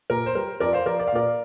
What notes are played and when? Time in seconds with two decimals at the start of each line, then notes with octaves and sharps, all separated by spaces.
0.10 A#2 A#4
0.26 C5
0.35 G3 A#4
0.60 F2 A#4 D5
0.73 C5 F5
0.86 F3 A#4 D5
1.00 D5
1.08 F5
1.12 A#2 A#4 D5